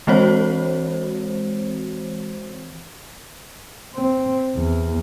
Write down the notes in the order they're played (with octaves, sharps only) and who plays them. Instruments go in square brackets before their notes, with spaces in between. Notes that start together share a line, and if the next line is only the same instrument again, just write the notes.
[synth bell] E3 G#3 C4 F#4 C5 C#5
[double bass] C4
E2